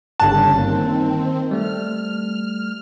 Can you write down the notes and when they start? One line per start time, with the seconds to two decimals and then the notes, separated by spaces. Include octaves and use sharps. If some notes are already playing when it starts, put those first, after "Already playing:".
0.20 G1 G2 C#3 G3 C#4 A5 F#6
0.58 D#3 A#3 C4
1.51 G3 A3 F6